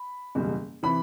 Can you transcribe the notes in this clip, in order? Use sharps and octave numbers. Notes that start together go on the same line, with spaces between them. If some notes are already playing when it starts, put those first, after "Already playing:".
Already playing: B5
F#1 E2 B2 G3
C3 E3 B5